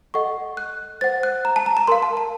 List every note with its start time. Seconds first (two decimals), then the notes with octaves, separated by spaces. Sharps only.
0.14 A4 D#5 F#5 C#6
0.57 F#6
1.01 C5 F#5 A6
1.23 F#6
1.45 A#5
1.56 A5
1.66 A#5
1.77 A#5
1.88 A#4 F5 C6
2.02 A5
2.17 A5